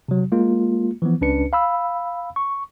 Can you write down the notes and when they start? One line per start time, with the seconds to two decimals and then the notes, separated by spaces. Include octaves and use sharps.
0.08 C3 F#3
0.32 G#3 A#3 F4
1.02 E3 F3 B3
1.21 C#2 C#4 D4 B4 C#7
1.53 F5 B5 E6
2.36 C#6